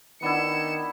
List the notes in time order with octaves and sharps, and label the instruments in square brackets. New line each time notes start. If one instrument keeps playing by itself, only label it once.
[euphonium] D#3 [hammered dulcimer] B3 D4 E4 [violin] C#7 E7